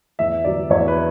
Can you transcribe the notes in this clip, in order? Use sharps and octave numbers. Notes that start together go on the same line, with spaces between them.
E2 E5
D3 F#3 D5
E2 C#5
B4